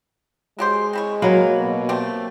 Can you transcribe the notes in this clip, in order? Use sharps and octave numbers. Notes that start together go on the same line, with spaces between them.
F#3 G#3 G4 C5
C4 E4 C#5
F#3 A#3 B4
B2
A3 C4 G4